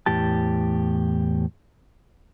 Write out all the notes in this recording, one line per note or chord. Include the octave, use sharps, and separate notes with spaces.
E2 A2 G4 A5